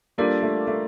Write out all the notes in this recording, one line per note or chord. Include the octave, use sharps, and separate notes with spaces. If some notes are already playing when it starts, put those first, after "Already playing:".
G3 A#3 D4 F4 A4 D5
A3
A3